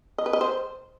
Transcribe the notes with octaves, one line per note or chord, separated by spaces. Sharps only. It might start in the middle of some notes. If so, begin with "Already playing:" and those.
D#5
B4
D#5
C5